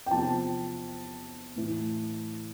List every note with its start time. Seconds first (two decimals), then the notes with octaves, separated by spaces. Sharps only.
0.06 G5
0.11 E2 C3 F3 A5
1.56 A2 E3